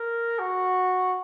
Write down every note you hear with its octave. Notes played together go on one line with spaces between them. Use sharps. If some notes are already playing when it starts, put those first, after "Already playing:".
Already playing: A#4
F#4